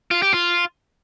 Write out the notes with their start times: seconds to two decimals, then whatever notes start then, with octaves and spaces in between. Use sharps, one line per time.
0.11 F4
0.22 G4
0.34 F4